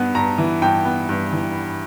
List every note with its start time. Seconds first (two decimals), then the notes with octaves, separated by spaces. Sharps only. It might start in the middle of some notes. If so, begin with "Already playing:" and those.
Already playing: G2 B3
0.15 G2 A#5
0.38 E3
0.62 G2 G5
0.85 B3
1.09 G2
1.33 E3